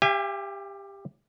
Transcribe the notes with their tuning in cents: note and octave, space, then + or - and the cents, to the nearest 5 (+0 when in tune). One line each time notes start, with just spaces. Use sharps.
G4 +15 E5 +45 G#5 -40